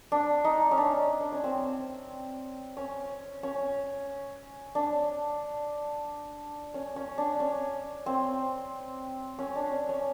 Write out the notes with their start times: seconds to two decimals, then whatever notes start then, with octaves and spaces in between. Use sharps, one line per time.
0.12 D4
0.45 D#4
0.71 C#4
0.78 D4
1.21 D4
1.32 C#4
1.44 C4
2.77 C#4
3.43 C#4
4.75 D4
6.74 C#4
6.96 C#4
7.18 D4
7.40 C#4
8.06 C4
9.39 C#4
9.56 D4
9.72 C#4
9.89 C#4